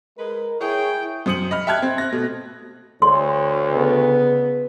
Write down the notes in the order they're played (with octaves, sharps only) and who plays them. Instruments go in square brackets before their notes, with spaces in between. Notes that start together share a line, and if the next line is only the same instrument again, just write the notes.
[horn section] G#3 B4 [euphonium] A#4
[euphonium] E4 [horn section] G#4 C#5 [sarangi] G5
[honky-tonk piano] F#2 C5 D#6 C#7 F#7
D#5 B5 F6
E5 G5 A5 F6 F#6 G#6
C4
F#6 A#6
B2 A3
[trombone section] D2 [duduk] C#5 [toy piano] C6
[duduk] C#3 [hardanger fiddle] B3